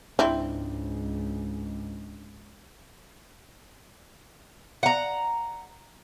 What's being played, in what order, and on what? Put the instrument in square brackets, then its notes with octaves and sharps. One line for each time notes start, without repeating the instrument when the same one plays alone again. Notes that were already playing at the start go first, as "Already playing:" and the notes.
[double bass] C#2 G#2 [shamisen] C4 E4 [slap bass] D4
[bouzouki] F#5 A#5